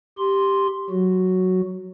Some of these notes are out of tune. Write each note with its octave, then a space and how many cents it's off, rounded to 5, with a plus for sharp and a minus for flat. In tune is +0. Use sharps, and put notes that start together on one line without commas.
G4 +0 C6 +0
F#3 +0 F#4 +0